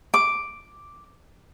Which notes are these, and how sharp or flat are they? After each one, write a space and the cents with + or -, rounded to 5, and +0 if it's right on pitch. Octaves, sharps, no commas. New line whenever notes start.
D6 +0